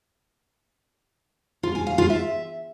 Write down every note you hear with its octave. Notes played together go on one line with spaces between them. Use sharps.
F4
G#5
F5
F4
E5